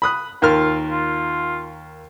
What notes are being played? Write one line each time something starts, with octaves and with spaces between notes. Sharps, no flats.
B5 D#6 F#6
D#2 F4 A#4 F6
F4